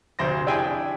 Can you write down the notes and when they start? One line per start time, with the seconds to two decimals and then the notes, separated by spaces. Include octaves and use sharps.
0.19 F1 D2 C5 A#6
0.47 D4 E4 G4 G#4 G5 G#5